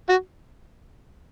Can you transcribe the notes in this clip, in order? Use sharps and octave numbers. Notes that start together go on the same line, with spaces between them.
F#4